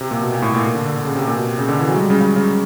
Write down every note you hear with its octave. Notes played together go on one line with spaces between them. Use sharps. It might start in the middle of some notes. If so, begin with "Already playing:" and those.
C3
A#2
B2
A#2
A2
A#2
A#2
D3
D3
D3
C#3
C3
A#2
B2
C3
C#3
D3
E3
F#3
G#3
G3
C#3
C#3
C#3